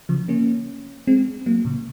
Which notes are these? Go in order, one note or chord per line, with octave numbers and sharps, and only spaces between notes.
C#3 F3
A#3 C#4
G#3 C4
F#3 A#3
A#2 C#3